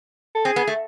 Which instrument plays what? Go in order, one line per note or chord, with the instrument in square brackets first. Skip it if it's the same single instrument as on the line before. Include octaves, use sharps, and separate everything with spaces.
[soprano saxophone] A4
[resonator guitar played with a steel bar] C4 [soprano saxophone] G#4
[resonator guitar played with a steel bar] B3
A3